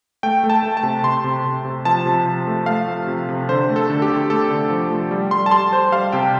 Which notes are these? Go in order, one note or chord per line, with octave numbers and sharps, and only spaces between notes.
A3 G5
A3
A5
A3
A5
C3
C3 C6
C3
C3
C3
F3 A5
C3
F3
A3
A3 F5
F3
C3
C3
D3 C5
A3
A4
D3
G4
D3
A3 A4
D3
F3
A3
G3
G3 C6
A5
G3 C6
G3 C5
G3 F5
C3 G5